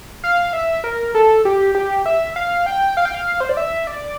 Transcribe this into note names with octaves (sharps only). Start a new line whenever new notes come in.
F5
E5
A#4
A4
G4
G4
E5
F5
G5
F5
G5
F5
C5
D5
E5
D5